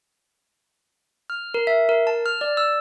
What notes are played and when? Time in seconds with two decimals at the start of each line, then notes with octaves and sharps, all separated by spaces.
1.30 F6
1.54 A#4
1.67 E5
1.89 A#4
2.07 A5
2.26 F6
2.41 D5
2.57 E6